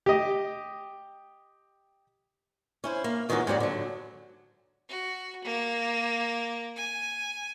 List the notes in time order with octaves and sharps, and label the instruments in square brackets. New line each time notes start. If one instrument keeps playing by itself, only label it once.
[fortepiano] G4 D#5
[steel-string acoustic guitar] C#4 E4 C5
A#3
A#2 D#3 E3 G#3 C#4 F#4
G#2 C3 F#3 G3
D3 F#3
[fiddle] F#4
A#3
G#5